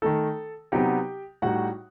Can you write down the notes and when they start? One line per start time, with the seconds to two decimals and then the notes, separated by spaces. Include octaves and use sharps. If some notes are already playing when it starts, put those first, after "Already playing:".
0.02 D#3 A3 D#4 A4 A5
0.72 C3 F#3 B3 D#4 G4 G5
1.42 A2 G3 D#4 F#4 F#5